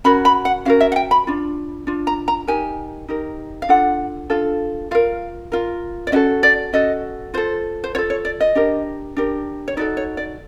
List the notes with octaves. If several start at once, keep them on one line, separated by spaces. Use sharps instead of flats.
C#4 F#4 A#4 B5
B5
F#5
C#4 F#4 A#4 F5
E5
F#5
G5
B5
D4 F4
D4 F4
A#5
A#5
D#4 G4 A#4 G#5
D#4 G4 A#4
F5
D4 F4 A4 F#5
D4 F4 A4
F4 A#4 F5
F4 A#4
D5
C#4 F#4 A4 D#5
D5
C#4 F#4 A4 D#5
F4 A4 C5
C5
F4 A4 C#5
C#5
D5
D#5
D4 G4 A#4
D4 G4 A#4
C#5
D#4 F#4 A4 D5
C#5
D5